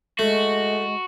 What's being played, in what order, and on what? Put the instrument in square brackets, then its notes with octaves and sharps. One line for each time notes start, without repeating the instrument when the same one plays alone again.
[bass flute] G#3 [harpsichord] A3 [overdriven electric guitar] F#4